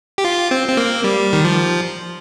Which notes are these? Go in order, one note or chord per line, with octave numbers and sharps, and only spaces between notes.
G4
F4
C4
C4
A#3
G3
D#3
F3